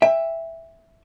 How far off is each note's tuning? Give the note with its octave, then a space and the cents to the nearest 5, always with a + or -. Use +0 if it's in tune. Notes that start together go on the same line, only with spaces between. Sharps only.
E5 +0 G5 +35